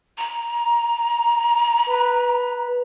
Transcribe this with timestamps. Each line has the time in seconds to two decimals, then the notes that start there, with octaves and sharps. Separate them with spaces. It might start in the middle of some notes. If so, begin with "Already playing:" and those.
0.18 A#5
1.86 B4